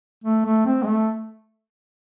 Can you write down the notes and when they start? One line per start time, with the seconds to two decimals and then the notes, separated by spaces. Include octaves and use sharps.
0.24 A3
0.45 A3
0.66 C4
0.83 G#3
0.88 A3